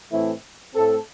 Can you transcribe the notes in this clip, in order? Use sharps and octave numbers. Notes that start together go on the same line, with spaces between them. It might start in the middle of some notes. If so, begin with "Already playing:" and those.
A2 E3 A3 C4 E4
A2 A3 C4 A4